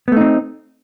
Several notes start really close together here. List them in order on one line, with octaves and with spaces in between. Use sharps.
B3 A3 D#4 C4